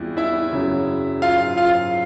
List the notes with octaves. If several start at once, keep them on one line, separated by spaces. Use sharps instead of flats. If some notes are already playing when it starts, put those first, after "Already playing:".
Already playing: E2 C3 E3 G3 E4 F4
E4 E5
F#2 C#3 F#3
F4 F5
F4 F5